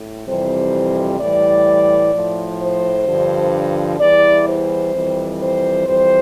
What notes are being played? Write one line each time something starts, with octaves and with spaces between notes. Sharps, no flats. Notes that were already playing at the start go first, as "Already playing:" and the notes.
Already playing: A2
F2 C3 E3 G3 C5
A2 E3 G3 D5
A2 F3
C5
G2 D3 F3
E2 E3 G3 D5
C5
F2 E3 G3
C5
F2 E3 G3 C5